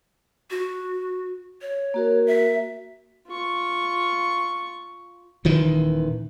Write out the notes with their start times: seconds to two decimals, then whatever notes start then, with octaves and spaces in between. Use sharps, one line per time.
0.50 F#4
1.62 C#5
1.94 A#3 F#4 A#4
2.27 E5
3.27 F4 C#6
5.45 D#1 D#3 E3